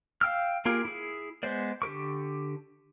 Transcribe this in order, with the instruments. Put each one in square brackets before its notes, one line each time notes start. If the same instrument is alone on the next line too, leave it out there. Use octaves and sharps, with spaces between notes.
[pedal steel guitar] F5 G5 E6 F6
A#3 F4 G4 G#4 A#4
E4 G#4
G#3 B3 C5 D5
D3 G4 A#4 C#6